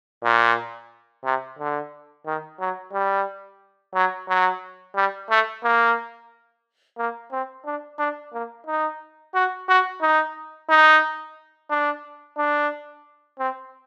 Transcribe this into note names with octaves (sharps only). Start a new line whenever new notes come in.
A#2
C3
D3
D#3
F#3
G3
F#3
F#3
G3
A3
A#3
A#3
C4
D4
D4
A#3
D#4
F#4
F#4
D#4
D#4
D4
D4
C4